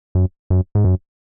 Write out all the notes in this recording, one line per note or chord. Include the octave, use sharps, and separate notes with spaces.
F#2
F#2
G#2
F#2